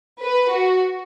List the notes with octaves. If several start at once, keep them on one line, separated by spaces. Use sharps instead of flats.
B4
F#4